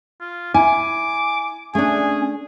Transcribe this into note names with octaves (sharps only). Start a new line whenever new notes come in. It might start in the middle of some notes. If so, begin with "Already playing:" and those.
F4
E4 G#5 D6
A3 C#4 D4 G#4